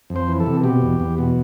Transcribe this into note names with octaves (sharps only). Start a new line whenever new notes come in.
F2
C5
E3
A4
C3
B2 G4
E2
E2
B2